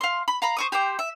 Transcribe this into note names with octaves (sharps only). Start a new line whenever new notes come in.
F5 C6
B5
F5 A#5 B5
C5 C#6 D#6
G4 C5 G5 D6
E5